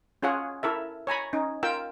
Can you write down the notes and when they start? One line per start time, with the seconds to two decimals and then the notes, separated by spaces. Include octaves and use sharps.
0.23 C#4 F4 G#4 C#5 F#5
0.63 E4 A4 A#4 E5
1.07 C#5 G#5 A#5 B5
1.33 C#4 D#4
1.63 F4 A#4 G5 E6